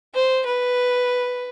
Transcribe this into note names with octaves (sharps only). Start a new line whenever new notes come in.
C5
B4